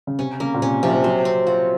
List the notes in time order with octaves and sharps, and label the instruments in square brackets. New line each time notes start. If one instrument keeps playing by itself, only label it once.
[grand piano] C#3
[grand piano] C3 [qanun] C#4
[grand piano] C#3 [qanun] A#3
[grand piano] A#2
[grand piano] C3 [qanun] C#4
[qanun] C3 [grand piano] F3
[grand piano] F3
[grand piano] F#3 [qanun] C5
[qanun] C4
[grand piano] F4 [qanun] F#4